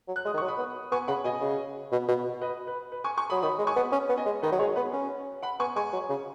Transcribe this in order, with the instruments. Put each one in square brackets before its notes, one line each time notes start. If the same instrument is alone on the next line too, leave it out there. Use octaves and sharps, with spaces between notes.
[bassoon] F#3
[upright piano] F#6
[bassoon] G#3 [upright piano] D#6
[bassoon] D#3
[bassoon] F#3 [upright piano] C#6
[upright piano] B5 D#6
[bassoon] B3
[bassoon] B3 [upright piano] G#5 C#6
[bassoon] C#3 [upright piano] F#5 B5
[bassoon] B2 [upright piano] D#5 G#5
[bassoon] C#3
B2
B2
[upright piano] B4 D#5
B4
B4
G#5 C#6
G#5 C#6
[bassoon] F#3 [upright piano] B5 D#6
[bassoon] D#3 [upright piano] B5 D#6
[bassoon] G#3
[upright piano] G#5 C#6
[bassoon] B3
C#4
B3
[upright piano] D#5 G#5
[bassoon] G#3
[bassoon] D#3 [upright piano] B4 D#5
[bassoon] F#3
[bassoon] G#3 [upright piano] G#4 C#5
[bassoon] B3 [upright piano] B4
[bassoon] C#4
[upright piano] F#5 B5
[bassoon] B3 [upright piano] G#5 C#6
[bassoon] G#3 [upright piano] G#5 C#6
[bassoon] F#3
C#3